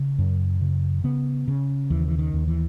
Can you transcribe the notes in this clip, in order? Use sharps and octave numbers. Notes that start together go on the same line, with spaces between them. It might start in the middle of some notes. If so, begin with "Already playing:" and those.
Already playing: C#3
F#2
C#3
C#3 B3
C#3
D#2 E3
E3
D#3
D#2
E3